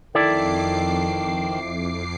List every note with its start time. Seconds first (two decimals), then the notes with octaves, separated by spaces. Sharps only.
0.15 F2 D#3 E4 A4 D5 D6 C7